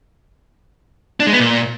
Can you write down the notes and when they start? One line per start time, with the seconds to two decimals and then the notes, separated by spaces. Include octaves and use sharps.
1.20 D4
1.27 G#3
1.33 B3
1.39 A#2